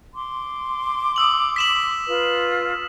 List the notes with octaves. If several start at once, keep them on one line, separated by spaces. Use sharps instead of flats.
C6 D6
D#6 E6 F#7
B6 E7 F#7
F4 B4